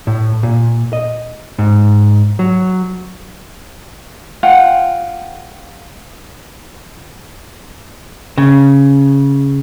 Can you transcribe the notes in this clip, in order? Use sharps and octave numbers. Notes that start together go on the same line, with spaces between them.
A2
A#2
D#5
G#2
F#3
F4 F#5 G5
C#3